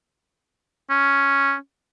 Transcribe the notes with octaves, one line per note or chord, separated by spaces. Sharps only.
C#4